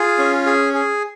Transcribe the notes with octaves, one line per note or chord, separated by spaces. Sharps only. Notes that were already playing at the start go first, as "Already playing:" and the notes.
Already playing: F4 G#4
C#4
G#4
G#4